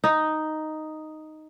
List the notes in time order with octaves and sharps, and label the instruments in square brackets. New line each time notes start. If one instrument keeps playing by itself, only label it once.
[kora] D#4